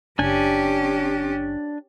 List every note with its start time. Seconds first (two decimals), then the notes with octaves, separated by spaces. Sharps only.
0.19 F#1 C#4 D4 G4 G#5